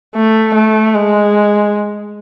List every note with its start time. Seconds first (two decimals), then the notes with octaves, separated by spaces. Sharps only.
0.15 A3
0.55 A3
0.94 G#3